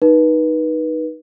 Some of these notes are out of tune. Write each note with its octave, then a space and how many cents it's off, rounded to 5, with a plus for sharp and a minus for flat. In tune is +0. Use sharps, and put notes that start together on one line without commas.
D#4 +0 B4 -25